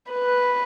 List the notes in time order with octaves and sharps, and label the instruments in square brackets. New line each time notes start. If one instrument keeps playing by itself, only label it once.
[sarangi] B4